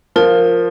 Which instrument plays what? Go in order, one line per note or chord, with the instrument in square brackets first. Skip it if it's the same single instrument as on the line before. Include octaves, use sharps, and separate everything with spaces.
[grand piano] F3 [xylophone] A#4